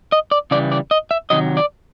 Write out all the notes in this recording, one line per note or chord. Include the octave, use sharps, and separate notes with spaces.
D#5
D5
C#3 E3 G3 D5
D5
D#5
E5
C3 D#3 F#3 D#5
D5